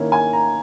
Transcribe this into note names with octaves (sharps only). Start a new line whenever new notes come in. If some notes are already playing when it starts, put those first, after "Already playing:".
Already playing: D#3 A#3 C#4 E4
G#5
A#5